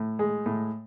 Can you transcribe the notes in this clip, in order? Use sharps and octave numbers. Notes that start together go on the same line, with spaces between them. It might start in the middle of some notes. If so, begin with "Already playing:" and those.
Already playing: A2
G#3
A2